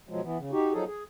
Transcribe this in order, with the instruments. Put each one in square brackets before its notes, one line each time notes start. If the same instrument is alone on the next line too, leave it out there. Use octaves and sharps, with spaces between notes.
[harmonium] B2 F3 F#3 G#3
E3 B3
C#3
D#4 F#4 G4
F3 F#3 D#4 G#4 A4
G#4